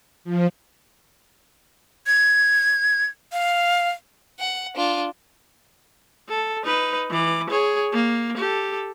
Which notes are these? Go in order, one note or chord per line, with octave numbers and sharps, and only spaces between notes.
F3
G#6
F5
F#5
D4 F4
A4
D#4 B4
E3 D6
G#4 C#5
A#3
G4 A4